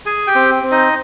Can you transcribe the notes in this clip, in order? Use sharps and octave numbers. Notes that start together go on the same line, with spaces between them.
G#4 G#5
G4 G5
C4
C4
D#4 D#5